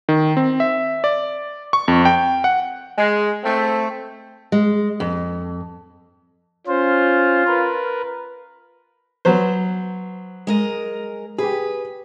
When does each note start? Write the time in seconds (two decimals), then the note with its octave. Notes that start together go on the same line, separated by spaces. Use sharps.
0.09 D#3
0.37 C4
0.60 E5
1.04 D5
1.73 C#6
1.88 F2
2.05 G5
2.44 F#5
2.98 G#3
3.44 A3 C4
4.52 G#3
5.00 F2
6.67 C#4 F4 C5
7.47 A#4 B4
9.25 F#3 B3 C5
10.47 G#3 A#4 D#5
11.38 G4 G#4 B4